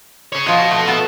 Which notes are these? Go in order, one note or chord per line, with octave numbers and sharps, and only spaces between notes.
G#4 C#5
F3 F#4 C#5 D#5
A3
B3 A4